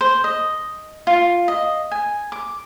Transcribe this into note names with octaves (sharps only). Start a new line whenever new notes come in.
C5
D#5
F4
D#5
G#5
D6